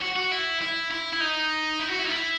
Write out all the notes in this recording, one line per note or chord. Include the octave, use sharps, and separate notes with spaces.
F#4
F#4
E4
E4
E4
E4
D#4
E4
F#4
E4
D#4
E4